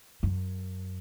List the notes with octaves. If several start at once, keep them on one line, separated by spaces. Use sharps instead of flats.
F#2